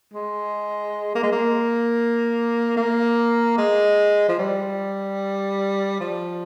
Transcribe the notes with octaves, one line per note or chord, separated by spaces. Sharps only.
G#3
A#3
G#3
A#3
A#3
G#3
F3
G3
F3